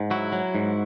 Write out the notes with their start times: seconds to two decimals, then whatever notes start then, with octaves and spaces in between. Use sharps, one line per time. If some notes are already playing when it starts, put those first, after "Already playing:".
Already playing: G#2
0.11 F#3 E4 F#4
0.32 F#3
0.55 G#2